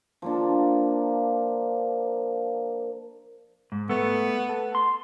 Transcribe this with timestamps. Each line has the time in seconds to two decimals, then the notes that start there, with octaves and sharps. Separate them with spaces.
0.22 F3 A#3 D4
3.72 G#2
3.89 A3 B3
4.49 A4
4.75 C6